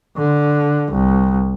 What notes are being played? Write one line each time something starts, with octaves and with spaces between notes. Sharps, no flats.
D3
C2